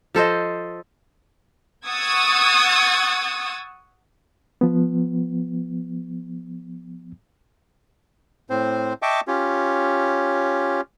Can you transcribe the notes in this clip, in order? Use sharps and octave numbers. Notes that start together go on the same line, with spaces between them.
F3 A4 C5 D#5
F#5 C#6 D#6 E6 G#6 A6
F3 B3
A2 C4 C5
D#5 E5 G5 A5 C#6 D6
C#4 F4 G4 C#5